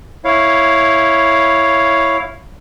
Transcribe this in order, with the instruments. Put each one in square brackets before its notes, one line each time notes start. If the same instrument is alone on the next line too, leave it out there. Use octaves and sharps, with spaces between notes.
[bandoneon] E4 C#5 F5